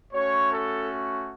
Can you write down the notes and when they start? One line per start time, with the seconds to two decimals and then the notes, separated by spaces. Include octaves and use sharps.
0.12 A3 C#4 F#4 C#5
0.50 A4